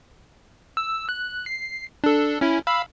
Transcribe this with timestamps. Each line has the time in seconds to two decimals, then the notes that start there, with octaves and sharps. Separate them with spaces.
0.77 E6
1.09 F#6
1.46 C7
2.04 D4 A4
2.41 C#4 E4
2.67 F5 B5 E6